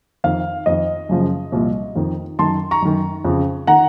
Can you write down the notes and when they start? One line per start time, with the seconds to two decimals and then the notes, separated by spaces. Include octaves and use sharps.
0.24 F2 D#3 F5
0.66 F2 D#3 D#5
1.09 F#2 C#3 F3
1.52 C2 A#2 F3
1.96 F2 D#3
2.39 F#2 D#3 A5 C6
2.71 A#5 C#6
2.82 F#2 D#3
3.25 F2 C#3 F3
3.67 D#3 F#5 A#5